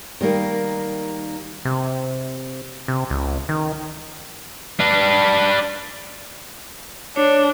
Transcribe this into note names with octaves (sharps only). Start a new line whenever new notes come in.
D#3 G3 A#3
C3
C3
C#2
D#3
D4 B4
D4 C#5